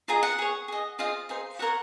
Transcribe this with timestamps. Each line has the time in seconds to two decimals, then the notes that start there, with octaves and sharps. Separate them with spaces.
0.08 F4 G#4 D#5 A#5
0.23 F#5
0.39 G#4 C#5
0.68 G#4 D#5
0.99 F4 G#4 C5 D#5 F5
1.29 D#4 G#4 C5
1.59 F#4 A#4 C#5 F#5